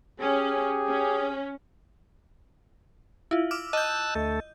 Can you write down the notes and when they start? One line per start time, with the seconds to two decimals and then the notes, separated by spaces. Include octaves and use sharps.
0.19 C#4 G4 G#4
0.87 C#4
3.31 E4 F4
3.51 D6 E6 F6
3.73 D#5 A5 E6 F#6 G6
4.15 D2 A3 A4